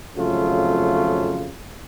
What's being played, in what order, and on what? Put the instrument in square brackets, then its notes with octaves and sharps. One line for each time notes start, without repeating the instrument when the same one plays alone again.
[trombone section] G#1 F2 C#3 F#3 A3 F4